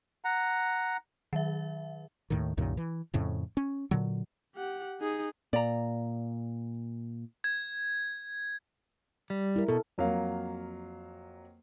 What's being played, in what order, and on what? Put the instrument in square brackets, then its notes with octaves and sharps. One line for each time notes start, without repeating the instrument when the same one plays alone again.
[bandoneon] F#5 A#5
[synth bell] D#3 F#3 E5
[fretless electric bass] D#2 A2 D#3
C2 F#2 A#2 D#3
E3
F2 A2 C#3
C#4
A#2 D3 F#3
[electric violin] G4 F#5
D#4 G#4
[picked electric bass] A#2 [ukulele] D5 A#5
[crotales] G#6
[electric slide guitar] G3
[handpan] E4 A#4
[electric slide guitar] B2 [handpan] A4
[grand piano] F2 F#3 A#3 F5